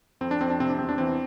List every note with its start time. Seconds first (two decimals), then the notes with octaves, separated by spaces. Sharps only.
0.21 F2 C4
0.31 D4
0.40 F2 C4
0.50 D4
0.60 C3 C4
0.69 D4
0.79 E2 C4
0.89 D4
0.98 E3 C4